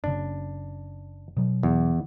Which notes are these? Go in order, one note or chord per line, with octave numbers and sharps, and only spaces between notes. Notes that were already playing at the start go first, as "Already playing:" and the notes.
F#1 C#3 D4
B2 F#3
E2